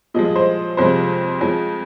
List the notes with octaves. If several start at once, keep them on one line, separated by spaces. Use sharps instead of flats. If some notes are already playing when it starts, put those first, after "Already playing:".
A#2 F3 G#3 D#5
D#5
C5
F2 C3 F3 G#3 C5
F2 F3 G#3